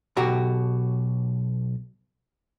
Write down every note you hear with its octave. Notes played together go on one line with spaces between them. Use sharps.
B1 B2 F#4 G4 A#5